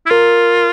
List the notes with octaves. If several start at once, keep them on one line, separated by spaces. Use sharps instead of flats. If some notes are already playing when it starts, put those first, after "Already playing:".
E4
F4 A#4